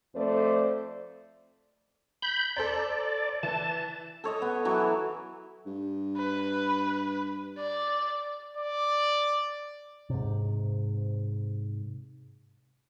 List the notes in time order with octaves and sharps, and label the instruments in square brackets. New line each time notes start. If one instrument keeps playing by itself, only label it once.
[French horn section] F2 A3 C5 D5
[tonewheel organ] B5 G6
[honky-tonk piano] A4 C5 A#5 [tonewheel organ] D5
[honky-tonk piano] E3 [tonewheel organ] A5
[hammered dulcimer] A4 C#5 D#5
B3
E3 F#3
[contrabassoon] G2
[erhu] B4
D5
[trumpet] D5
[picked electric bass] G#2 C3